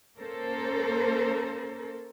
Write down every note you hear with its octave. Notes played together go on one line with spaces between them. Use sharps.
A#3 C#4 A4 A#4 C5